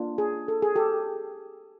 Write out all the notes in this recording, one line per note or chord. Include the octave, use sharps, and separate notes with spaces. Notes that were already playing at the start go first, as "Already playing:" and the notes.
Already playing: A#3 D4 F4
G#4
A4
G#4
G4 A4